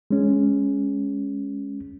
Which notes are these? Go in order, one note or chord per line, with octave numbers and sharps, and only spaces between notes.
G#3 C#4